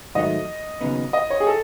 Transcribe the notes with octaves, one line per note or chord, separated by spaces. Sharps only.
G#2 D#3 F#3 A3 D#5
D#2 C#3 F#3 B3 D#4
D#5
C#5
G#4
A4